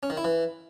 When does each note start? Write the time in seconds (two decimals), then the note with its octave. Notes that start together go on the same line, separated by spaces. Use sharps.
0.03 C#4
0.10 D#3
0.17 E4
0.25 E3